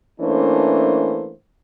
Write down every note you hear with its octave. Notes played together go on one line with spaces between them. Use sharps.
E3 A3 A#3 C#4 D4 C5